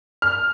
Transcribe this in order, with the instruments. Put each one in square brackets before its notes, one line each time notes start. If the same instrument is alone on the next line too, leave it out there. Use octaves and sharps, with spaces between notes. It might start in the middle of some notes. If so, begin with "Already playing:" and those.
[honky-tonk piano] F6